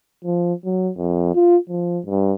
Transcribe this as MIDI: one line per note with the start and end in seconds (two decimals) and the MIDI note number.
0.25 0.54 53
0.65 0.91 54
0.96 1.31 41
1.35 1.57 65
1.70 2.00 53
2.06 2.34 43